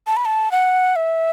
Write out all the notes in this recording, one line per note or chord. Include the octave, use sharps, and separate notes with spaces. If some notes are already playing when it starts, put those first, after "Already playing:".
A5
B5
A5
F#5
E5